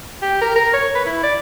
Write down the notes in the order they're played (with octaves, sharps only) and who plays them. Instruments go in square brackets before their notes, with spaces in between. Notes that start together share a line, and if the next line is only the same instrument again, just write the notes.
[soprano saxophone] G4
A#4
A#4
C#5
B4
E4
D5